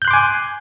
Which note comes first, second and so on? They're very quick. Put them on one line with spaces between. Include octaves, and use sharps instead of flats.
G6 F#6 C6 D6 G#5